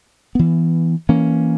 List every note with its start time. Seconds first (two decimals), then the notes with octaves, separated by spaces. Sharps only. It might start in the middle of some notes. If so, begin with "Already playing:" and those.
0.35 E3 B3
1.09 E3 A#3 C#4